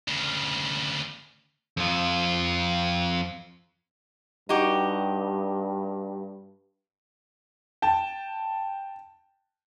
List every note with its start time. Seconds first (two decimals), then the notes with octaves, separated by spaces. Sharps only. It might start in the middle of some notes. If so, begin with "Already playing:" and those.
0.08 D2 C#3
1.77 F2 F4
4.49 G2 D#4 F#4 G4
7.82 G5 A5